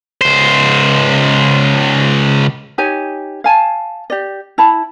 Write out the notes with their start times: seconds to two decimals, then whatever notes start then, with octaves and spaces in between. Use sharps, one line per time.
0.21 C#2 C5
2.78 D#4 G4 C#5 G#5
3.44 F5 G#5 A5
4.10 G4 D5
4.58 E4 A5 B5